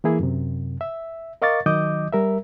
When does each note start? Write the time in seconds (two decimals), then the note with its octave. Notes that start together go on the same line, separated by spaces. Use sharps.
0.04 E3 A#3 E4 G#4
0.20 F#2 C3
0.81 E5
1.42 A#4 D#5 F5 C#6 D6 A6
1.66 D#3 F#3 D#5 D6 D#6 G6
2.13 G3 A#4 E5